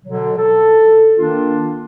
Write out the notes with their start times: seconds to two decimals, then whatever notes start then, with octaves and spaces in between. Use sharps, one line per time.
0.05 B2 D3 F#3
0.37 A4
1.17 D#3 A#3 D4 F4